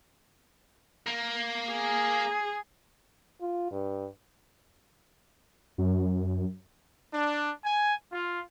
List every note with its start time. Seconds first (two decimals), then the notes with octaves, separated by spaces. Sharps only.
1.07 A#3
1.72 G#4
3.41 F4
3.71 G2
5.78 F#2
7.14 D4
7.64 G#5
8.12 F4